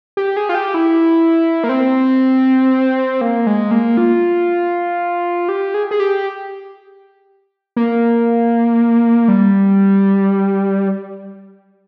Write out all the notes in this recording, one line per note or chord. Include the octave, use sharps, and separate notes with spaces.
G4
G#4
F4
G4
E4
A#3
C4
A#3
G#3
A#3
F4
G4
G#4
G#4
G4
A#3
G3